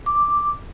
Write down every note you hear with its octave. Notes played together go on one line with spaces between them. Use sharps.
D6